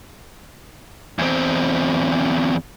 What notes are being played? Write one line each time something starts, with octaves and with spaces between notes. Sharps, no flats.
E2 C4